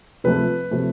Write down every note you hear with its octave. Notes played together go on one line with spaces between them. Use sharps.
C3 F3 A3 B4
C3 F3 A3